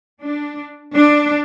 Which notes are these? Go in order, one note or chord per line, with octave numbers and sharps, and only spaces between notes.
D4
D4